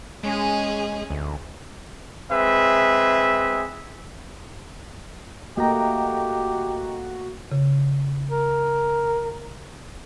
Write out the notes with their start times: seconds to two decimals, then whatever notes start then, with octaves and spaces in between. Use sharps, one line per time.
0.24 G#3 C#4 G#4
1.10 D2
2.31 G#3 C4 G#4 B4 E5
5.57 A3 A#3 F#4 G4 D#5 G5 A#5
7.52 C#3
8.30 A#4